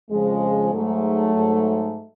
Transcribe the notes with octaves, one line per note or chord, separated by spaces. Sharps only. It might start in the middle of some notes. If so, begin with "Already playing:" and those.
F2 C#3 F3 G#3
G#2 F#3 A3
G#2